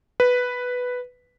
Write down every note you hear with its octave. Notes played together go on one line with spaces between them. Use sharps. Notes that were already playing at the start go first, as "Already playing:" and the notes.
B4